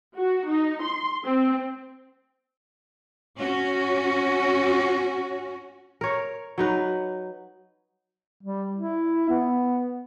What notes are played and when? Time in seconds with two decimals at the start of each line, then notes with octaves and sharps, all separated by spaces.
0.15 F#4
0.49 D#4
0.81 C6
1.26 C4
3.39 C#4 F#4
6.01 A#4 C#5
6.58 F#3 D#4 B4
8.43 G3
8.75 E4
9.29 B3